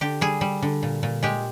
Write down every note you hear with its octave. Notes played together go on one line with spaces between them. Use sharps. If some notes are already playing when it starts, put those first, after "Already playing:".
D3 G4
G3 G#4
G3
D3
A#2
A#2
G#3 G4